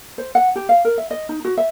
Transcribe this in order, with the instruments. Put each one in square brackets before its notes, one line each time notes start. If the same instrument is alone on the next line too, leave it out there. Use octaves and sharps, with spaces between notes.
[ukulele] C5
F#5
G4
F5
A#4
E5
D#5
D#4
F#4
E5